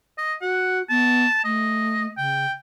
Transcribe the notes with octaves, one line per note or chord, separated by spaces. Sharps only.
D#5
F#4 F#5
B3 A5
A3 D#5
C#3 G5